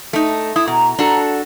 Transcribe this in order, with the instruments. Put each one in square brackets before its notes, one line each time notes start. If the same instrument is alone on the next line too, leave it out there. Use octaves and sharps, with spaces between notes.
[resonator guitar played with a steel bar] A3 D#4
[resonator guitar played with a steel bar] E4 [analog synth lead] D#6
[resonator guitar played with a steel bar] B2 [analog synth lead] A#5
[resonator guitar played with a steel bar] D4 F#4 A4